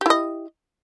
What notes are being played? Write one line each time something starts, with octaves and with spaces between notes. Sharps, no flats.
E4 G4 D#5